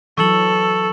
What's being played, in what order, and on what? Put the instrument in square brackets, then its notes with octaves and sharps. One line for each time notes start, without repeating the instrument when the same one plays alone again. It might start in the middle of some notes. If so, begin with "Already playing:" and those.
[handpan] E3 F#3 [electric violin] A4 [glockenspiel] C#6 E6 F#7